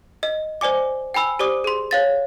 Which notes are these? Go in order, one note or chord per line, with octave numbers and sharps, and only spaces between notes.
D#5
C5 D5 G#5 D6
G5 G#5 B5 E6
G4 C5 D5 D6 D#6
G#4 C6
C#5 F5 A6